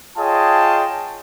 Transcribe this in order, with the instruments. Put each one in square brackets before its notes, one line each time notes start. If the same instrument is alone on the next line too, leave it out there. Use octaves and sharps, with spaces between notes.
[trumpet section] F4 G#4 C#5 D#5 G5 A5